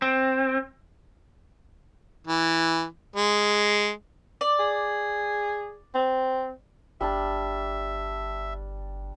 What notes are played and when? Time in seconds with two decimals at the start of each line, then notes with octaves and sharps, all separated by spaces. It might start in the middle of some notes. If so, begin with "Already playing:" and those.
0.02 C4
2.27 E3
3.16 G#3
4.41 D5
4.59 G#4
5.95 C4
7.01 G1 G3 D4 E5 A5